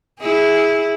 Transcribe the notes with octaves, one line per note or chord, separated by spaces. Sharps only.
E4 G#4